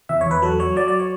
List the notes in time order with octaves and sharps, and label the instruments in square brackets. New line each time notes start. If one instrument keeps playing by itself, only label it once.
[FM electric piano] E2 E5
E2 C#5
B4
F#3 A4
F#3 C#5
F#3 D5
D5
C#5